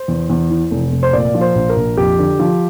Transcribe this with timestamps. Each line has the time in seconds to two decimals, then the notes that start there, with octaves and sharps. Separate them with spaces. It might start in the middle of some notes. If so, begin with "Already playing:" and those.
Already playing: C5
0.08 E2
0.30 E2
0.50 E3
0.71 F1
0.92 F1
1.03 C5
1.13 A#2 D5
1.35 F3
1.41 C5
1.55 A#1
1.69 A#4
1.76 A#1
1.97 F2 G4
2.19 D3
2.40 F3